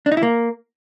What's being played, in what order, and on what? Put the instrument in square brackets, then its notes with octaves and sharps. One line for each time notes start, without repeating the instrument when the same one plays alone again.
[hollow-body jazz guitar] D4
D#4
E4
A#3